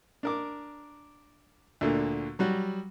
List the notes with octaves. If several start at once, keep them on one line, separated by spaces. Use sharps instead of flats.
D4 A#4 D6
D2 A#2 D3
F#3 G3 F#4